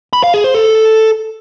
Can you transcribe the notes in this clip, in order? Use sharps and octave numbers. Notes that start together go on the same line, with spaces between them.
B5
F5
G#4
C5
A4